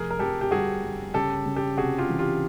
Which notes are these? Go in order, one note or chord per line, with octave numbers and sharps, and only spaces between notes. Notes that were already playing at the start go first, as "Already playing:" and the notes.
Already playing: F1 G#4 A#4
A#4
F2 G4 A4
G4
G1 F#4 G#4
G1
C#3 G4 A4
C#3
G4 A4
C3 F#4 G#4
F4 G4
E3
F4 G4